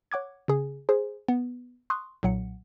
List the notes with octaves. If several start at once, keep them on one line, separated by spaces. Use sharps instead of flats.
C#5 F#5 D6 G#6
C#3 G#4
G#4 C5
B3
C6 C#6 D#6 F#6
B1 A#2 F#3 F#5 C#7